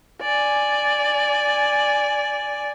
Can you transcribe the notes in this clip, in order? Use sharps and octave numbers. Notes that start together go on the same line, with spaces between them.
D5 G#5